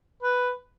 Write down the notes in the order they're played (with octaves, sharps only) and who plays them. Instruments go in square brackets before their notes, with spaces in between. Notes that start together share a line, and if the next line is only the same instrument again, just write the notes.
[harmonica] B4